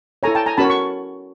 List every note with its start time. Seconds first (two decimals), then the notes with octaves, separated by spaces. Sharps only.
0.23 E4 A4 C#5 G#5 A#5
0.35 G5 A5
0.46 G#5 A#5
0.57 C#4 F#4 A#4 C#5 A5 B5
0.70 C#6